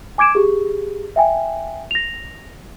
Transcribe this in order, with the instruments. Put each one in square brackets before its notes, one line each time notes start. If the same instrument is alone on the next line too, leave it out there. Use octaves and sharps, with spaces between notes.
[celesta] G#5 D6 G#6 D7 E7
G4 G#4
E5 G5 G#5
A#6 F7